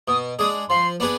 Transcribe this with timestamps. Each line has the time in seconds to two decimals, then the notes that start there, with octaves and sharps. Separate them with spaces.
0.08 B2 D#6
0.39 G#3 D4 G#4 D#6
0.69 F3 C6
1.00 B3 D4 G#4 B4